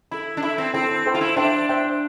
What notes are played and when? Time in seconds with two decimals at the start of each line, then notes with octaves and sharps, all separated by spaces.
0.11 E4 A4 E5 B5
0.37 D4
0.42 E4 A4 E5 B5
0.58 C4
0.74 C4 E4 A4 C5 G5
1.06 E4 A4 C5 G5
1.15 F4
1.21 E4
1.37 D4 C5 E5 G5
1.69 C5 E5 G5